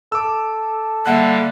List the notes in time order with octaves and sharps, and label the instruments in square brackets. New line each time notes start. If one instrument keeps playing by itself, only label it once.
[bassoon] A4 [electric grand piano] D6 E6
[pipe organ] D3 G3 [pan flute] A#3 [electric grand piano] E5 F#5 F#6